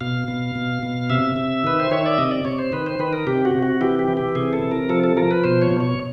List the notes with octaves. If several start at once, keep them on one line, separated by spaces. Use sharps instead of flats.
B2 F5
B2
B2
B2
C3 E5
C3
D#3 B4
C5
D#3 C#5
D5
C3 D#5
D5
C3 C#5
C5
D#3 B4
C5
D#3 B4
A#4
C3 G4
F#4
C3
F#4
E3 G4
G4
E3
G4
C3 G#4
A4
C3
A#4
F3 A4
A4
F3 A#4
B4
B2 C5
C#5
B2
C#5